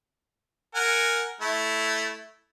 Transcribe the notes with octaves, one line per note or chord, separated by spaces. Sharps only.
A#4 F#5 G#5
A3 E4